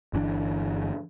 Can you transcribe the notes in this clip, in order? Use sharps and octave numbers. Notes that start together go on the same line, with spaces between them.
G1 E3 C#4 D4